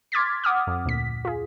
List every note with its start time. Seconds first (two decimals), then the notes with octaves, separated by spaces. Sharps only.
0.12 C6 D6 F6 G#6 A6 B6
0.44 F#5 D6 D#6 F6
0.67 F2
0.85 D2 A#2 B6
1.25 F4 G#4